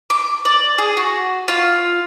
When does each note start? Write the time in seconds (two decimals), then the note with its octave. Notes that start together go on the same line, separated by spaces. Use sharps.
0.10 D6
0.45 D5
0.78 G#4
0.97 F#4
1.48 F4